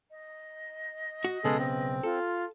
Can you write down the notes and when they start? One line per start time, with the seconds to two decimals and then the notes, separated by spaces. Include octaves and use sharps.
0.10 D#5
1.24 F#4
1.44 B1 C#3 G#3 B3 G#4 A4
1.59 C4
2.03 F4 A4